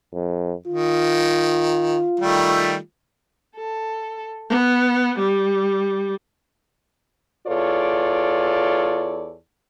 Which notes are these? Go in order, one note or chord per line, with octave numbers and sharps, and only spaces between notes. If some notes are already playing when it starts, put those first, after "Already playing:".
F2
D#3 F4
D#3 G3 A3
A4
B3
G3
E2 F4 A4 C#5 D5